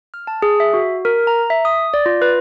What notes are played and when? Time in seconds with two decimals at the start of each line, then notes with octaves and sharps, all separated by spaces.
0.14 F6
0.27 A5
0.42 G#4
0.60 E5
0.74 F#4
1.05 A#4
1.27 A#5
1.50 E5
1.65 D#6
1.94 D5
2.06 F4
2.22 B4